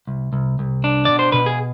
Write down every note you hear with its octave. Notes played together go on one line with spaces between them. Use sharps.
C2
C2
C2
D4
B2 D5
C5
B2 B4
G#4